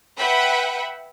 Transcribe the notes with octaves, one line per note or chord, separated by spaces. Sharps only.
B4 E5 F#5 G5 B5